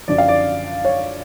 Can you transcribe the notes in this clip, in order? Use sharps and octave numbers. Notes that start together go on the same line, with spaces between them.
F#2 D3 F3 D5
F5
D5
C#5